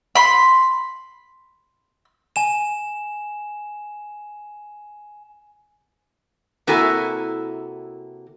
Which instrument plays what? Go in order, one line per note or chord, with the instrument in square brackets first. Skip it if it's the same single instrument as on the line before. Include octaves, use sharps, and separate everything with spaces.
[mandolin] B5 C6
[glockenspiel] G#5 E7
[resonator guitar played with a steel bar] C3 A#3 E4 F#4 A4 G#5